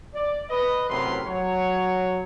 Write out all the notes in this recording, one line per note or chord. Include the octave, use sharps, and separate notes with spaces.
D5
B4 D#5
F#2 A2 C3 A#4 B4 C6
F#3 C#5